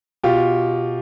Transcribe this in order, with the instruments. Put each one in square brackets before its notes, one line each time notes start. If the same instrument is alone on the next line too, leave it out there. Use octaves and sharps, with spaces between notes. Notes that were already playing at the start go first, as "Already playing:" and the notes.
[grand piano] B2 F4 G4